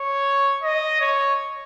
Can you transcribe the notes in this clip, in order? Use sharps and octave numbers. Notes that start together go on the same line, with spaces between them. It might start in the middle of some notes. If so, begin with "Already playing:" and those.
Already playing: C#5
D#5
C#5